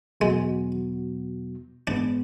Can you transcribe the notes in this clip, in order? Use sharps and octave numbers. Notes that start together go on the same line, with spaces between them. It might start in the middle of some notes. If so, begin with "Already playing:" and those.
E2 B2 F#3 G#3 B3 F#4
G#2 G#3 B3 D4